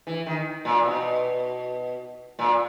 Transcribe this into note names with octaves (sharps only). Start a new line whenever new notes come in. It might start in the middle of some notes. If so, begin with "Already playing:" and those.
E3
D#3
A#2
B2
A#2